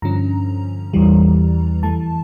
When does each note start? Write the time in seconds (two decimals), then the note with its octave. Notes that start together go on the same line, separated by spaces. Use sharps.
0.02 G2 D3 F3 C#4 A#5
0.93 E2 E3 G3
1.83 F2 E3 A3 A5